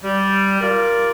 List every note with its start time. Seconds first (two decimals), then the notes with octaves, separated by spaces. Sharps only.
0.03 G3
0.61 F4 G4 A#4 D5